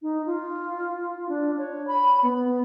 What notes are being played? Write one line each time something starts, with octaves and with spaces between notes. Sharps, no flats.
D#4
F4
D4
C#5
B5
B3